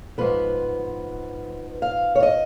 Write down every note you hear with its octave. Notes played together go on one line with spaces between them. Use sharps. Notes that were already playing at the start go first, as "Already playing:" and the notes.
G#2 F3 B3 B4
F5
C#5
D#5